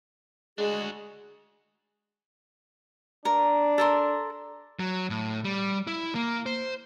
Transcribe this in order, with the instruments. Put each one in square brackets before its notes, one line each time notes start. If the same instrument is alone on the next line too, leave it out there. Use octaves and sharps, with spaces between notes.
[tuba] G#3 [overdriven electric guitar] D4 F#4 [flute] G#4
[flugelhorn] D4 [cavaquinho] A#4
[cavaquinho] A4 A#4 C6
[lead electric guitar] F#3
A2
G3
E4
A#3
C5